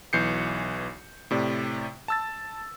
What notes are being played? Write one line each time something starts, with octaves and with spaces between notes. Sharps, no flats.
B1 E3 G6 C7 C#7
A2 C3 D5
A5 E6 A6